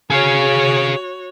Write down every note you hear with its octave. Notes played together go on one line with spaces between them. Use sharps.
F#4 G#4 C#5 F5